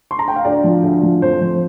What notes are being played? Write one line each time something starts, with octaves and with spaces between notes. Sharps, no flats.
C6
A#5
G5
F5
D2 D5
F3
D2
F3
F2 C5
F3